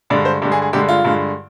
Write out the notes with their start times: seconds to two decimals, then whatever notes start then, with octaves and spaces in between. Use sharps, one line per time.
0.10 G2 D3 G#3 D5
0.25 C5
0.42 G2 D3 G#3 G4
0.52 G#4
0.62 G#4
0.73 G2 D3 G#3 G4
0.89 F4
1.05 G2 D3 G#3